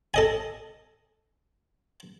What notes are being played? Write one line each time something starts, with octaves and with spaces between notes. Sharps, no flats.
A4 D#5 G#5